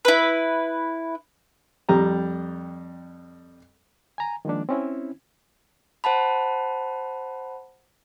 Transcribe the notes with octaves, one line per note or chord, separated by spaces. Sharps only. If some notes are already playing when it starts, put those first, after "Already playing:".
E4 B4
F2 G3 A#5
G#5 A#5
D#3 F3 G#3 A#3 D4
C4 C#4 E4
C5 F#5 A5 B5